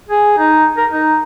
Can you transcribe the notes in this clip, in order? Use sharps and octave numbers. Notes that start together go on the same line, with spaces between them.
G#4
D#4
A#4
D#4